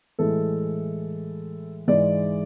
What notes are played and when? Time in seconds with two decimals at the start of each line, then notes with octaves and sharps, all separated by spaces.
0.19 A2 E3 G#3 A4
1.88 G#2 E3 G#3 D5